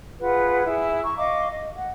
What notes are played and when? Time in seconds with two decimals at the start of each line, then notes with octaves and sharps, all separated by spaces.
0.21 F4 G#4 B4 F#5
0.66 E4 G#4
1.04 A#5 C#6
1.18 D#5 F5 C#6 D6
1.52 D#5
1.77 F#5